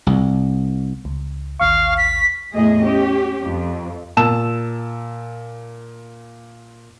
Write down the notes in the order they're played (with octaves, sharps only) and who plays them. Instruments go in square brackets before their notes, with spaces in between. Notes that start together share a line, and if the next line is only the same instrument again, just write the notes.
[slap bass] C2
[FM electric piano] C#2
[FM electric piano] A1 D#2 C#6 [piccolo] F5
[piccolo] B6
[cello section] E2 A2 A3 G#4 D#5
C#4 G4
F2
[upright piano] A#2 A5 E6 E7